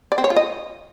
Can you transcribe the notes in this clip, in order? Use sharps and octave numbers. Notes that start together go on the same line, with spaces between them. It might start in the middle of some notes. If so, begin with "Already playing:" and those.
D5
C4
C#5
F4
D#5